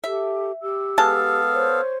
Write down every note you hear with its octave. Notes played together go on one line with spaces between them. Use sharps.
G4 A4 E5
G4 E6
G#3 B3 A4 F5 A5
C5 C#5